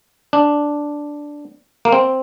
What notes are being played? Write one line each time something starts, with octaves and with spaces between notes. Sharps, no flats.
D4
A#3
C4